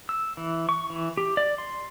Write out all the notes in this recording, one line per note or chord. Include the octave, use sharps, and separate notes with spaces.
E6
E3
C#6
E3
G4
D5
C6